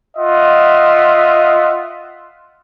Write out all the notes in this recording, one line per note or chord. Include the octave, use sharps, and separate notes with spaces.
F4 D#5 E5 F#5